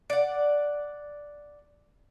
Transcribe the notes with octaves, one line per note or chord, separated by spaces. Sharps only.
D5 F#5